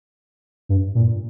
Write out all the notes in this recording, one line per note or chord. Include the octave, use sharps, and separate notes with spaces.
G2
A#2